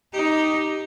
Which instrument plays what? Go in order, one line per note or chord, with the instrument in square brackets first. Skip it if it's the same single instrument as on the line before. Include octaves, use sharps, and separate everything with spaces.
[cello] D#4 [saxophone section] G4